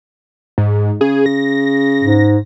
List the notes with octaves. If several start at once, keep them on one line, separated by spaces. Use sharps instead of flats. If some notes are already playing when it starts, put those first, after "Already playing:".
G#2
C#3 G#4
A#6
G#2